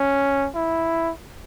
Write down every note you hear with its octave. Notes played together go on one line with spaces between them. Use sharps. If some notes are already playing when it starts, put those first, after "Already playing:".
Already playing: C#4
E4